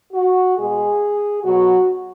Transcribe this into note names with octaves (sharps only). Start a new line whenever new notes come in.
F#4
B2 G#3 G#4
B2 F#3 F#4